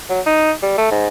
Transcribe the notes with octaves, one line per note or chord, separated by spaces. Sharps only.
F#3
D#4
G3
A3
G#2